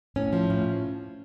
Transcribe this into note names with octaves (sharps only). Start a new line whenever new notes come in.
A2 C#4
F3
A2